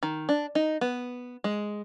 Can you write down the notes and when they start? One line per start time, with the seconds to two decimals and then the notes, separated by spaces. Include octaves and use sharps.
0.03 D#3
0.29 D4
0.55 D#4
0.81 B3
1.44 G#3